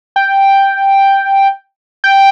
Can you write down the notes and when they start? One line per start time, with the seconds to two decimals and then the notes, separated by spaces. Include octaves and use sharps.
0.16 G5
2.04 G5